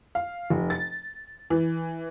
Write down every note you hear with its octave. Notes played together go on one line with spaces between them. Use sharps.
F5
F1
A6
E3